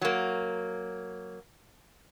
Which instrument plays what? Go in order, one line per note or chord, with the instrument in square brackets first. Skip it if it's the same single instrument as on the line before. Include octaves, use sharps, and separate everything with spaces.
[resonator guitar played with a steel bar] F#3 A#3